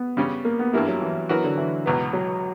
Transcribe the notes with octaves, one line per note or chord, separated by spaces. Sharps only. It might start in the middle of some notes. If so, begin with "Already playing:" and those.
Already playing: B3
C#3 G3 C#4
A#3
B3
G2 E3 G3 A#3 E4
F#3
E3
E3 F#3 B3 F#4 A#4
D3
E3
C#2 B2 F#3 B3
F#3